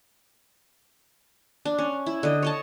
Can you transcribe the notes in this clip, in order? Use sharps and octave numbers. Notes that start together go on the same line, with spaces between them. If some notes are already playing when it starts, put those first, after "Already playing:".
D4
C#4
E4
D3 D#5
C#5 D#5 A5